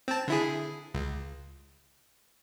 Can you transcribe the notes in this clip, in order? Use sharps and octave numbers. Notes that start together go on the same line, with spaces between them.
C4 A5
D3 E4 G#4
C#2